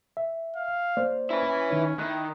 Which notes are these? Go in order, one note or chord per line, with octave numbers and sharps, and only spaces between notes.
E5
F5
A#3 C5 D5
C#4 E4 B4
D#3 D#4 C#5
D#3 E4 F#6